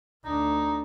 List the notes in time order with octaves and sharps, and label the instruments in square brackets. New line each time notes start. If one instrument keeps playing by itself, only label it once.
[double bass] D2 D4 [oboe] D#4